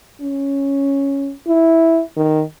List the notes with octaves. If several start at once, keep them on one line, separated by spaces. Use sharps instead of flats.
C#4
E4
D#3